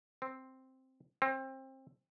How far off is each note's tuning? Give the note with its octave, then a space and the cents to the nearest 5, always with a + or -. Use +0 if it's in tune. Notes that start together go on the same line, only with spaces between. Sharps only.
C4 +0
C4 +25